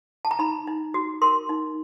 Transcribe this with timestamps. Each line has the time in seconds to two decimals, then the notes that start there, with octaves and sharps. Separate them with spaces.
0.25 A5
0.31 A#5
0.39 D#4 B5
0.67 D#4
0.94 F#4
1.22 A#4 C6
1.49 D#4